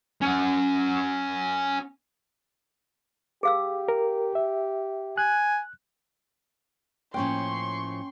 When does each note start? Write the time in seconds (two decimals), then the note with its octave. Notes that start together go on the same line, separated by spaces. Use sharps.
0.22 C#4 F#5
3.43 G4 G#4 F5 E6
3.88 A#4
4.35 E5
5.18 G#5 F#6
7.14 A2 F3 A#3 C#4 G5 C6 C#6